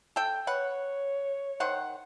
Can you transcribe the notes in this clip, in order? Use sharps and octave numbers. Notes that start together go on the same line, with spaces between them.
A4 G5
B4 C#5 F#5
D#3 C5 F#5